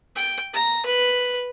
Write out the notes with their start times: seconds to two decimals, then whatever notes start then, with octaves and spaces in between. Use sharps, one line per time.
0.16 G5
0.54 A#5
0.86 B4